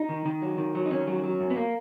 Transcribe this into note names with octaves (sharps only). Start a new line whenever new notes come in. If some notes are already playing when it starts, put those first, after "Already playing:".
Already playing: D#4
D#3
D#3
F#3
D#3
F#3
D#4
D#3 C#4
F#3
F#3
F#2
B3
A#3